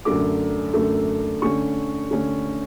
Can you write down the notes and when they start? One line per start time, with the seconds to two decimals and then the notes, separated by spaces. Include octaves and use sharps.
0.05 F#2 D3 A3 D6
0.74 F#2 D3 A3
1.42 D3 A3 C#4 C#6
2.11 D3 A3 C#4